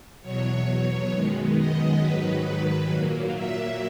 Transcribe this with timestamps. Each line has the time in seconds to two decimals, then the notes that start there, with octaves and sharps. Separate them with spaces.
0.22 E2 B2 F#3 C#5
1.11 F#2 D#3 G#3 B3
1.56 D#5
2.00 G#2 D#3 F#3 B4
2.44 B4
2.89 A#2 F#3 A#3
3.34 E5